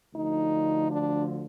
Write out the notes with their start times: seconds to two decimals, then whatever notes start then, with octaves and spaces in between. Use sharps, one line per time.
0.14 D2 D3 F3 D#4
0.90 D4